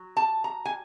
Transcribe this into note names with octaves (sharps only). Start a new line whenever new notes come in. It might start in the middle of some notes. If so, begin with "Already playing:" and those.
Already playing: F#3
A5
A#5
G#5